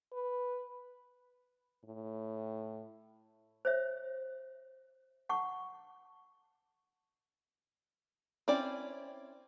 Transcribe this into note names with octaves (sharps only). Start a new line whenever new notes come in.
B4
A2
C5 C#5 E5
F#5 A5 C#6
C4 C#4 E4 D5